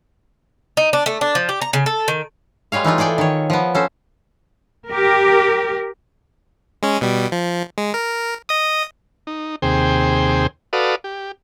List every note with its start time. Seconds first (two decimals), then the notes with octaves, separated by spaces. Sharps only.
0.77 D#4
0.93 D4
1.06 A3
1.21 D4
1.35 F3
1.49 G4
1.62 A#5
1.73 C#3
1.86 A4
2.08 D#3
2.72 G3 G#3 B4 C#5 F5
2.84 E3 A3 D#4 F4
2.98 G#4 A4 D5 G5 G#5
3.18 D#3 C#5
3.50 F3 B3
3.75 C#4 A4 C5
4.88 G4 A#4
6.83 G#3 C#4
7.01 B2 G3
7.32 F3
7.78 G#3
7.94 A#4
8.49 D#5 D#6
9.27 D#4
9.62 D#2 C3 G#4 C5 G5
10.73 F#4 A4 B4 D5 F5 D#6
11.04 G4